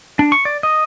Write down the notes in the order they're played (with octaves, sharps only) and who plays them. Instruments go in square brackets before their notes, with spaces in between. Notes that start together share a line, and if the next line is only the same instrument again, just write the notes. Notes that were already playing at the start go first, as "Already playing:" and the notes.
[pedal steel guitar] D4
C#6
D5
D#5